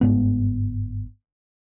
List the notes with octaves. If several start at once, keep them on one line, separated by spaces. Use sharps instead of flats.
G1 G#2 B3